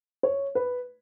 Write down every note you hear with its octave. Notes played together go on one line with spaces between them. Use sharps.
C#5
B4